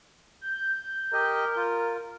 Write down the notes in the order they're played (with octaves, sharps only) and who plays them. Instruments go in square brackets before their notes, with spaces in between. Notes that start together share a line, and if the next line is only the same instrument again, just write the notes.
[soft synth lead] G6
[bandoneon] G4 D#5 [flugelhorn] A#4
[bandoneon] F4